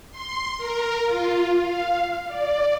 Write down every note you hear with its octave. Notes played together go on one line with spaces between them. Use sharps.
C6
A#4
F4
F5
D5